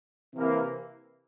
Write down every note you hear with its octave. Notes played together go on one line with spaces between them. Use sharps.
C3 E3 A#3